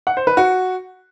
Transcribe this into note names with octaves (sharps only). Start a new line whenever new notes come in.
F#5
C5
B4
F#4